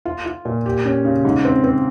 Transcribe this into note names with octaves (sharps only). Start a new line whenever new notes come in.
F4
F4
A#2
G4
C#4
C#3
G#2
C4
C4